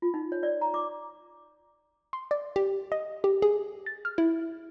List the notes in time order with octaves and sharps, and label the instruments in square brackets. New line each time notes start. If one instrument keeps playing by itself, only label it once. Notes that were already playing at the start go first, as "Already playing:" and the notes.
[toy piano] F4
D#4
C#5
D5
A#5
D6
[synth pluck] C6
D5
G4
D#5
G4
G#4
A6
F6
E4